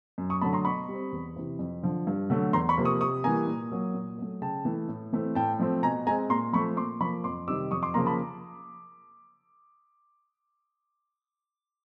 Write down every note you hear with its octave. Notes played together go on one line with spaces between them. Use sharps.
F#2
C#6 D#6
D3 F#3 A3 A5 B5
A#5 C6
B2 B5 C#6
G3 C4
E2
C3 E3
F2
D3 F3
G2
D3 F#3 A3
E2 A#5 C6
B5 C#6
C3 F3 A#3
C#6 D#6
C3 C#6 D#6
E3 G3 A#3 G#5 A#5
A#2
F#3 A#3
A#2
F#3 A3
C#3 G5 A5
E3 A3
A2
E3 A3 C4
A2 G5 A5
F3 A3 C4
B2 G#5 A#5
G#3 C4 G#5 A#5
A#2 A#5 C6
F3 A3 C4 B5 C#6
A#2 C6 D6
F3 A#3 B5 C#6
F2 C6 D6
C3 D#3 G3 D6 E6
F2 C#6 D#6
C6 D6
C#3 F3 A#3 A#5 C6
A5 B5